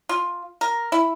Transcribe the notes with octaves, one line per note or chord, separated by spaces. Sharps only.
F4
A#4
E4